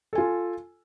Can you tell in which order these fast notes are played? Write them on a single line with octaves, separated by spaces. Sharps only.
A4 G#5 F4